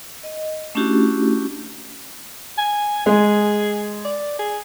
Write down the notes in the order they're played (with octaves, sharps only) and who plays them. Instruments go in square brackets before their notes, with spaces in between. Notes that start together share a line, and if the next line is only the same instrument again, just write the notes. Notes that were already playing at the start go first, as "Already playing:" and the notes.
[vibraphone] D#5
A3 C#4 D4 E4 F#4 G4
[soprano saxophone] G#5
[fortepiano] G#3 [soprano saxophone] G#4
[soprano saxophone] D5
G#4